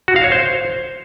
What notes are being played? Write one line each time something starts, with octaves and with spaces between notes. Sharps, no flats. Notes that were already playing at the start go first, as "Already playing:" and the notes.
F#4
F5
C#5
C5